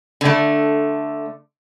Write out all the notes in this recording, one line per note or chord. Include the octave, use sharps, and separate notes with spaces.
D3 A3